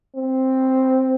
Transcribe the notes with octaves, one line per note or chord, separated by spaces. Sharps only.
C4